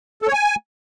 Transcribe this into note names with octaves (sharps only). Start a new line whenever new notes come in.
A4
C#5
G#5